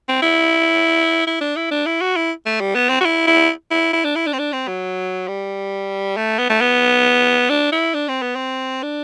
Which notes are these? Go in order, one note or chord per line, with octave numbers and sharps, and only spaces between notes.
C4
E4
E4
D4
E4
D4
E4
F#4
E4
A3
G3
B3
C4
F#4
E4
E4
E4
E4
D4
E4
D4
C4
D4
C4
F#3
G3
A3
B3
A3
B3
D4
E4
D4
C4
B3
C4
D4